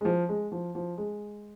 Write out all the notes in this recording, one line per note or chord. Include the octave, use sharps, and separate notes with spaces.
G#3
F3
G#3
F3
F3
G#3